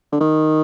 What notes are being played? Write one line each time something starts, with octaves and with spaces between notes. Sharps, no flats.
D3
D#3